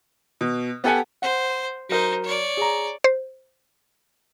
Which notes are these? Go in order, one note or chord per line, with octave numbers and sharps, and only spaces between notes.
B2
B3 G4 A4 F#5 G#5
C5 F#5
F#3 D#4 A#4 C5
C#5 D5
G#4 A#5
C5